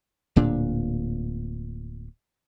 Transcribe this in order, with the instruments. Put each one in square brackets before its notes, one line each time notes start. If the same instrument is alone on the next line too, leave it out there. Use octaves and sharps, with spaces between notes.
[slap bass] D1 A#2 D4